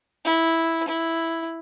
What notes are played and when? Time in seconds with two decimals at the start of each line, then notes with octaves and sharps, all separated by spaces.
0.25 E4
0.88 E4